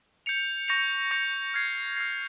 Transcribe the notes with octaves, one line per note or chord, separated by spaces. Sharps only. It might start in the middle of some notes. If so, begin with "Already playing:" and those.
G6 C#7 F7
C#6 G6 A#6 C#7 F7
C#6 G6 A#6 C#7 F7
F6 G#6 C7
F6 G#6 C7